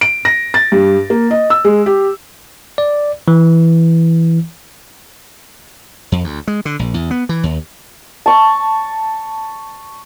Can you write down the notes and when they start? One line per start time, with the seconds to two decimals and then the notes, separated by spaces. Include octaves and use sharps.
0.01 D7
0.25 A#6
0.54 A6
0.72 G2
1.10 A#3
1.31 D#5
1.50 E6
1.65 G#3
1.86 G4
2.78 D5
3.28 E3
6.12 F2
6.24 D2
6.48 G#3
6.65 D3
6.79 A#1
6.94 E2
7.11 B3
7.29 E3
7.43 D#2
8.26 A5 C#6